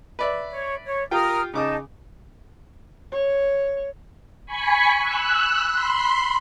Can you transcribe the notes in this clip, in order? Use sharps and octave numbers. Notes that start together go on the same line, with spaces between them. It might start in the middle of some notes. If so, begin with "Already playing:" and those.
B4 D5 E5
C#5
C#5
F4 G4 A#4 G5 D#6 F6
C#3 D#4 A5 D6 D#6
C#5
G#5 B5 C#6
E6 F#6
B5 C6